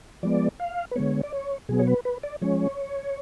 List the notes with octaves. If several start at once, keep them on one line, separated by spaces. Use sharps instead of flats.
F3 G#3 B3 D5
F5
B4
D3 G#3 B3 C#5
D5
C#5
B2 F#3 B3 G#4
C#5
B4
B4
D5
F3 G#3 C#4 C#5